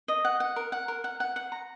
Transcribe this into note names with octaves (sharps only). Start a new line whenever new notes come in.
D#5
F#5
F#5
A#4
F#5
A#4
F#5
F#5
F#5
A#5